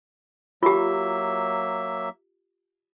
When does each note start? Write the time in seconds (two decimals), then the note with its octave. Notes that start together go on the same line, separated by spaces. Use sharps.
0.63 F#3 A#3 F4 G4 E5